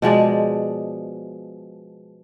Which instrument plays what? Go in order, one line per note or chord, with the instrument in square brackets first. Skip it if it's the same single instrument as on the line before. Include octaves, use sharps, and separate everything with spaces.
[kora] B2 F3 G#3 D5